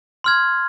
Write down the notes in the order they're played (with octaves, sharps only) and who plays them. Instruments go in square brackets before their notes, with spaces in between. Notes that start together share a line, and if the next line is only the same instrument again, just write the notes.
[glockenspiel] C6 F6 G#6